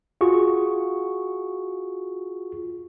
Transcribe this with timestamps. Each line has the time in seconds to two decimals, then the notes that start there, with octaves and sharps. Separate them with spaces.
0.21 F4 F#4 G#4 C#6